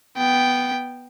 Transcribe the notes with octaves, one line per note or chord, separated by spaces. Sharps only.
B3 G5